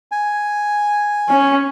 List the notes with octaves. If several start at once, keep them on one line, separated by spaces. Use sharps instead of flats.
G#5
C#4